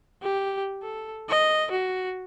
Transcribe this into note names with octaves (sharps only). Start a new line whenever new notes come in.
G4
A4
D#5
F#4